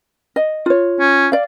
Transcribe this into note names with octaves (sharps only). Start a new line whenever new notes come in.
D#5
F4 C#5
C#4
D5 F5